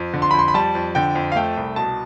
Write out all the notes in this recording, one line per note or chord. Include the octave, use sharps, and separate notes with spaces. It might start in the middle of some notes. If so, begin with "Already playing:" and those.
Already playing: F2
D3
C6
F2 B5
C6
B5
G3 A5
F2
D3 G5
F2
F5
A3 G5
C2
B2 A5